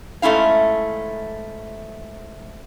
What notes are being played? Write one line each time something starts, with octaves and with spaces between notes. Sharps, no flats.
G#2 A3 C#4 E4 F5